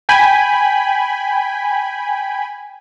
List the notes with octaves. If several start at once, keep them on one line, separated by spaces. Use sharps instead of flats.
G5 G#5 B5